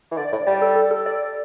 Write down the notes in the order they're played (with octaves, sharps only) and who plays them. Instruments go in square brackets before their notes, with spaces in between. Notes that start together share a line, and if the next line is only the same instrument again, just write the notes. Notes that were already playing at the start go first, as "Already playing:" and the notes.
[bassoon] E3
[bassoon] D3 [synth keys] D5
[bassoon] A2
[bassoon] G3 [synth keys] D5
[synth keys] A4
A4
A4
D5